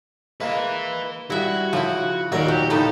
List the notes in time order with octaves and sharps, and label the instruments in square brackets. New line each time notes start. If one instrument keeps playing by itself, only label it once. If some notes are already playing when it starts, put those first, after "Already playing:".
[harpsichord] G#3 A#3 [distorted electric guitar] B4 E5
[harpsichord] G2 [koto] E4 E5 [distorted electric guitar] F#4
[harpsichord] C#3 [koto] F3 E4
[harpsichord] D#2 F#3 A#5 [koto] A#2 [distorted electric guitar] F#4 D5
[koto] F#4 [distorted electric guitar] G4
[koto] A2 F3 D#4 [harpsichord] C#3 B4 [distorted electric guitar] A4